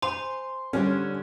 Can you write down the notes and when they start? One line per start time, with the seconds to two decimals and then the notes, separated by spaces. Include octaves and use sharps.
0.02 C5 G#5 A#5 C6
0.73 D3 G3 C#4 D4